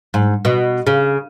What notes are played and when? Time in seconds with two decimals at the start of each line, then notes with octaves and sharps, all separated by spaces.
0.14 G#2
0.45 B2
0.87 C#3